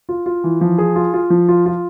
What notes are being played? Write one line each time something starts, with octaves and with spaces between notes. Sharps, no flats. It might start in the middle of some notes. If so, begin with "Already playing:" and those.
F4
F4
E3
F3
G#4
F4
F4
F3
F4
F4